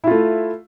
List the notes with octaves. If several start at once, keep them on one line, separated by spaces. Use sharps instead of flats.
A3 E4 F4